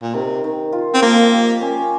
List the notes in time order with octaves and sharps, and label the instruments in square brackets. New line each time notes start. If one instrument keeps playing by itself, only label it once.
[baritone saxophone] A#2
[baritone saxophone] C3 [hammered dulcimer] D#3
[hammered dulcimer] D#3
F4
[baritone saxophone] C4
[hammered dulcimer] F3 [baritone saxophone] A#3
[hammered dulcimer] G4
C#4